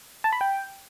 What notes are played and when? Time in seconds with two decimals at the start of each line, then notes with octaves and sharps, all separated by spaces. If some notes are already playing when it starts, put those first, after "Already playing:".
0.24 A5
0.33 B5
0.41 G5